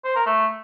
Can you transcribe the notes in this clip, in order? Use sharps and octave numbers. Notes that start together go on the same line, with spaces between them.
C5
A#4
A3